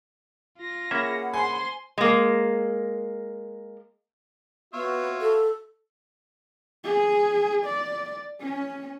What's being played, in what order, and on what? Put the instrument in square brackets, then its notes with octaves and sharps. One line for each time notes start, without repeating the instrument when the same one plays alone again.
[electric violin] F4 A#6
[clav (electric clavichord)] A#3 C#4 E5 [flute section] G#4 F#5 B5
[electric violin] C5 C6 [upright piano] G#5
[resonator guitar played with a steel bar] G#3 A#3
[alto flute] B3 [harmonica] F4 C#5 E5 [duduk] F#4
[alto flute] A4
[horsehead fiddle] G#4
D5
C#4